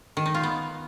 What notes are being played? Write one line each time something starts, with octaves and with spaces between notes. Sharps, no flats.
D#3
D#4
F4
B3